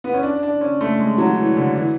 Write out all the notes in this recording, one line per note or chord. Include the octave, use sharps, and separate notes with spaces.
B3
C#4
D4
D4
C#4
A3
G#3
F#3
E3
D3
E3